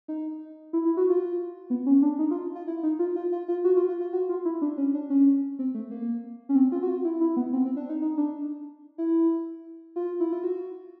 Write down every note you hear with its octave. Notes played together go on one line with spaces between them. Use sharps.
D#4
E4
E4
F#4
F4
B3
C#4
D4
D#4
F4
F4
E4
D#4
F4
F4
F4
F4
F#4
F4
F4
F4
F#4
F4
E4
D4
C#4
D4
C#4
C4
A3
A#3
C#4
C4
F4
F#4
F4
E4
E4
B3
C4
C4
D4
D#4
D#4
D4
E4
F4
E4
F4
F#4